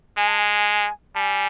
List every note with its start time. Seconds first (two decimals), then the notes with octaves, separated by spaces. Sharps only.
0.17 G#3 G#5
0.27 A5
0.38 G#5
1.15 G3 G#5 A5